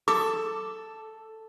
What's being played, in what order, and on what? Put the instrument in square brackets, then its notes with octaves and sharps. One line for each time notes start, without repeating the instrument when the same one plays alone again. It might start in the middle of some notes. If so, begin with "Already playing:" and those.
[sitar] A4 [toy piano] D6